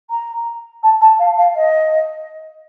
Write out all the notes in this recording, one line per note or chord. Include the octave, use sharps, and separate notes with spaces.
A#5
A5
A5
F5
F5
D#5